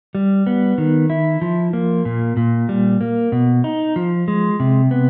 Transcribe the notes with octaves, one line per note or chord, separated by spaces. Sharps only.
G3
B3
D#3
E4
F3
A#3
A#2
A#2
G3
A#3
B2
D#4
F3
G#3
C3
B3